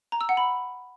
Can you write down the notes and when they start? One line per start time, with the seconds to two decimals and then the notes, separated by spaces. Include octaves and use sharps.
0.12 A#5
0.21 E6
0.29 F#5
0.37 B5